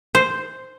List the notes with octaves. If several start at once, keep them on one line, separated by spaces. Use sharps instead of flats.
C5